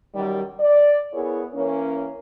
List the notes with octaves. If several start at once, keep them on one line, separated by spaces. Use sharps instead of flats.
F#2 D#3 G3
D5
B3 E4 G#4 A#4 C#5
E3 A#3 C#4